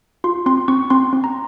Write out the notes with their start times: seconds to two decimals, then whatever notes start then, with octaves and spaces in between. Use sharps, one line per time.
0.24 F4 C6
0.46 C4 C6
0.68 C4 C#6
0.90 C4 C6
1.13 C4
1.24 A#5